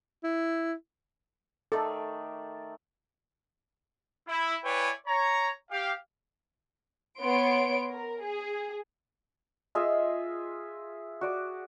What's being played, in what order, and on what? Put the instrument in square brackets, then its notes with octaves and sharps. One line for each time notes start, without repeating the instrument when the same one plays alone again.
[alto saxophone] E4
[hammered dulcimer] D#3 A3 D5 [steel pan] A4
[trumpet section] E4
E4 B4 C#5 D5 G5 G#5
C#5 A#5
G4 F5
[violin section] B3 C#5 C6 D7
A#4
G#4
[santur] F4 G#4 D#5 E5
F#4 D5 D6